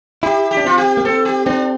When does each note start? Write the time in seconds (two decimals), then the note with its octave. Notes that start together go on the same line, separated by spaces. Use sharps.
0.23 E4 G4
0.51 G4
0.57 D4
0.64 C4 F4
0.78 G4
0.97 A#3
1.05 C4 A4
1.25 G4
1.46 C4 D4